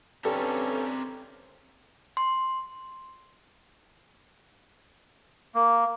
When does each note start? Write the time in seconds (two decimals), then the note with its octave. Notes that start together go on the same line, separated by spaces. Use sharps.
0.25 G2 C4 C#4 G4 A4 A#4
2.17 C6
5.55 A#3